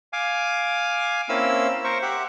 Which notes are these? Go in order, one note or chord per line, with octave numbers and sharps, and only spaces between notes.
F5 G#5 D6
A#3 C4 C#4 E4 E6
A#4 C5 C#6
G4 E5 F#5